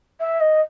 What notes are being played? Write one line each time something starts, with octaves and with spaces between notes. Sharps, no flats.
E5
D#5